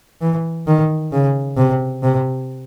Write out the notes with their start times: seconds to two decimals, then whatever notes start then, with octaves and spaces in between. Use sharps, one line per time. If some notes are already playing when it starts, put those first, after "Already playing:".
0.21 E3
0.67 D#3
1.12 C#3
1.57 C3
2.03 C3